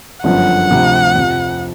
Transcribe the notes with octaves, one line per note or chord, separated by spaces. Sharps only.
G1 F#2 D3 F3 F#5
D2 C3 F3
F2 C3 F3